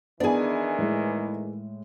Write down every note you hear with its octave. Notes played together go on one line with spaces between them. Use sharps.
D#3 E3 B3 D4 G#4 D5 G#5
A2 G#3